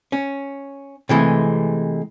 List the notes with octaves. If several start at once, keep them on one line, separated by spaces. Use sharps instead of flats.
C#4
C3 E3 G#3 A3